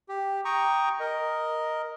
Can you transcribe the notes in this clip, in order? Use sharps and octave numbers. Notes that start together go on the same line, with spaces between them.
G4
G5 A#5 C#6 D#6
A#4 D#5